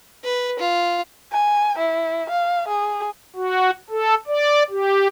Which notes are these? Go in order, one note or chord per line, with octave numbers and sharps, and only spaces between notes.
B4
F4
G#5
E4
F5
G#4
F#4
A4
D5
G4